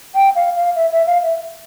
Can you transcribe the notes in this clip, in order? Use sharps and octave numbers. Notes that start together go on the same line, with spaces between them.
G5
F5
F5
E5
E5
F5
E5